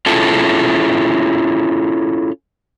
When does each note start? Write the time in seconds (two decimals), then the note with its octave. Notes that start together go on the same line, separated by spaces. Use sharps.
0.06 C#4 E4 F4 G#4 A4